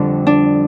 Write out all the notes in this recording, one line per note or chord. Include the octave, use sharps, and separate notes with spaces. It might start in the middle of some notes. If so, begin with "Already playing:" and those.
Already playing: F2 D3 G3 D4
D4